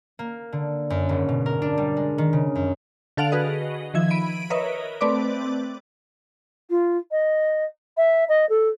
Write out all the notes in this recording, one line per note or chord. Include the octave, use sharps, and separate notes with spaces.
A#3
D3
F#2
G#1
B2
A#4
D4
G3
G#3
D#3
C#3
F#2
D3 A4 F5 F#5 D7 F7
F#4 G#4 B4 D#5
D#3 F3 E5 G#6
B5 D7 D#7
A#4 B4 C#5 D#5 E5
A3 C4 B4 D5 D6
F4
D#5
E5
D#5
A4